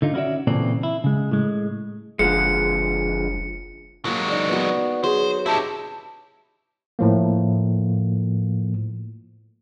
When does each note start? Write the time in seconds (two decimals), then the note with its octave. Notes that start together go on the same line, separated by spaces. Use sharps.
0.02 D3 D#4 F4
0.14 C#4 E4 F#4 D5 E5
0.47 A#2 C#3 E3 C4 A4 D5
0.83 E4
1.04 C#3 G#3
1.31 A2 G#3
2.19 F#1 D3 F3 G#3 C#7
4.05 F#3 G#3 A#3 F#4
4.28 D#4 D5 D#5
4.49 B3 F#4
5.04 F#3 G#4 C5
5.46 D#4 E4 G4 C#5 A5
6.99 A2 F3 A#3